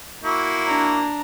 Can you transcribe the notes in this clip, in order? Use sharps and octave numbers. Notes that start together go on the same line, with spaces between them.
A#3 E4 F#4
D4 A#5